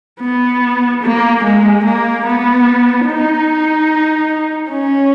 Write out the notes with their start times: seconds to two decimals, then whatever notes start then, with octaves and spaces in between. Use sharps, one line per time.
0.20 B3
1.03 A#3
1.44 G#3
1.84 A#3
2.25 B3
3.07 D#4
4.70 C#4